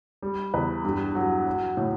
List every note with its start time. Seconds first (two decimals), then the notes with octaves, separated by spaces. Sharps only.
0.22 G3
0.54 E2 B4
0.84 G2
1.15 F#3
1.47 F#3
1.77 A2